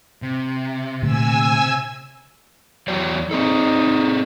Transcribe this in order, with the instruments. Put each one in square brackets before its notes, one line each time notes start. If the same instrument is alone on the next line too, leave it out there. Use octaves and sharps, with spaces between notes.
[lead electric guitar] C3
[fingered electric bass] A#2 D3 A3 [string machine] G#5 E6
[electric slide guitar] E2 F#3 D5
[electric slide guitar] C4 G#4 A4 [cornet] D#4